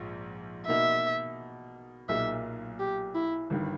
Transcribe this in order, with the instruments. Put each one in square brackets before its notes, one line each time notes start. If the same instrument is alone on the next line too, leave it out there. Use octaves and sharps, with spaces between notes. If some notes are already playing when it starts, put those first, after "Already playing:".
Already playing: [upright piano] A#1 G#2
[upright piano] B2 A#3 D#4 [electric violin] E5
[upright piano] B1 A#2 A#3 D#4 G#4 [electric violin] E5
[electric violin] G4
E4
[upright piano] G1 G2 D#3